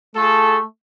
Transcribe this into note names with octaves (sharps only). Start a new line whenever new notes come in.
A3 F4 G#4 A4